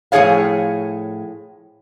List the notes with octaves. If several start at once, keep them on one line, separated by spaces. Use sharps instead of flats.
A2 F3 C#4 G#4 C#5 F5